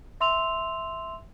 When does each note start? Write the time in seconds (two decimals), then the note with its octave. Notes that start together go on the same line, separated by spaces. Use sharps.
0.20 E5 C6 E6 F7